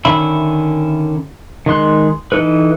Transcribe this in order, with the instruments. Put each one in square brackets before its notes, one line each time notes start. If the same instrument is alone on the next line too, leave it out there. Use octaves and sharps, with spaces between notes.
[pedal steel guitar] D3 D#3 C#4 E5 B5
D#3 G#3 C6 F#6
E3 D#4 A4 B4